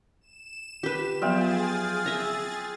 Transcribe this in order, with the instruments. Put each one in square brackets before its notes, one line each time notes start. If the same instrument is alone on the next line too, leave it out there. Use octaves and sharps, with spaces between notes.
[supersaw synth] E7
[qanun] G4 B4
[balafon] F3 F#3 B3 [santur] F4 F5 G5 [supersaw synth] G#4 A6
[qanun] E5 A#5